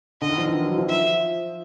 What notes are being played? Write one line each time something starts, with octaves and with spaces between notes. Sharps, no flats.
D3 D#5
D#3
F3
E3
F#3
F3
E5